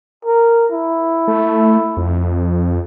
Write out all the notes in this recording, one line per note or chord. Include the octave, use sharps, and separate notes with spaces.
A#4
E4
A3
F2